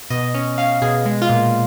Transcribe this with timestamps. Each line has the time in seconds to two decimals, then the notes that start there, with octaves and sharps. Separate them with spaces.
0.10 B2 D#5
0.34 C#4
0.58 C#4 F5
0.82 B2 G#4
1.06 G#3
1.22 F4
1.29 A#2